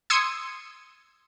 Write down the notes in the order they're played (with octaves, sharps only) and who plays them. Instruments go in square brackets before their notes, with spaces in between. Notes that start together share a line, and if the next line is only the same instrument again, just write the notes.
[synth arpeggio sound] C6 D#6 E6 G#6 C#7